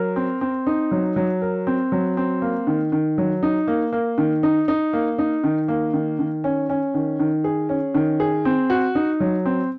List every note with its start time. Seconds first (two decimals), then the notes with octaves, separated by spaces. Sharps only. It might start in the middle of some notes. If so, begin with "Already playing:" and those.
Already playing: F#3 A#4
0.16 C4
0.41 C4
0.67 D#4
0.91 F#3
1.16 F#3
1.42 A#4
1.67 C4
1.92 F#3
2.17 C4
2.42 A#3
2.67 D#3
2.92 D#3
3.18 F#3
3.43 D#4
3.68 A#3
3.92 A#3
4.18 D#3
4.43 D#4
4.68 D#4
4.93 A#3
5.18 D#4
5.44 D#3
5.68 A#3
5.93 D#3
6.19 D#3
6.44 C#4
6.69 C#4
6.94 D#3
7.20 D#3
7.44 G#4
7.69 C#4
7.94 D#3
8.20 G#4
8.45 C4
8.70 F#4
8.95 D#4
9.20 F#3
9.45 C4